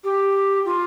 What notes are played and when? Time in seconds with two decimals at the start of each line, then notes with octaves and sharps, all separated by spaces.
0.04 G4
0.66 F4